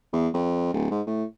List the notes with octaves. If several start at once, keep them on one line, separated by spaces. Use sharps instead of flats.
E2
F2
D1
G#2
A2